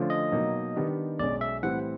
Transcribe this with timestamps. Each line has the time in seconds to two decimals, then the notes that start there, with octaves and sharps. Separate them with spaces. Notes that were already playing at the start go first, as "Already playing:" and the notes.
Already playing: D3 F3 A3 C#4 F4
0.10 D#5
0.32 B2 F#3 A#3 D#4
0.76 D#3 G3 B3 D4 G4
1.19 B1 B2 G#3 C#4 D5
1.41 E5
1.63 A2 E3 G3 C4 F#5